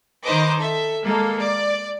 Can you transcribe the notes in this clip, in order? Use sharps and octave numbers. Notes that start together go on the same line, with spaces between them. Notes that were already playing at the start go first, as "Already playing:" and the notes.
D#3 D#4 B4 C5 D#5 D6
A4 E5
G#3 A#3 A4
D5